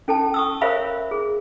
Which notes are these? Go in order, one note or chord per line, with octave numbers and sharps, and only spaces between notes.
C#4 A4 G5 A5
C#6 D#6 E6
A#4 C5 C#5 E5 F5 B5
G#4